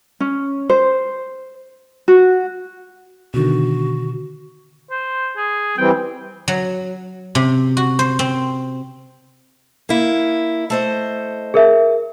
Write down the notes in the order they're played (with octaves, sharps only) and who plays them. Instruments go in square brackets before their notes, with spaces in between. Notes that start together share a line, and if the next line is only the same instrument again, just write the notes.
[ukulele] C#4
C5
F#4
[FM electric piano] B2 D3 D#3 [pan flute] F#4
[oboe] C5
G#4
[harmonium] E3 G3 C4 [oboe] G5
[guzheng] F#3
C3
F#4
C5
C4
[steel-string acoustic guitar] A#3 E4
A3 C5 D#5
[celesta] G#4 A#4 E5